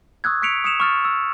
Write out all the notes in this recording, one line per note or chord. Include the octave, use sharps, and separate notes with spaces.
C#6 D#6 E6 F#6 G#6
C#6 F#6 B6 C#7 D7 F7
D#6 C#7 E7 F7
C#6 F6 A6
E6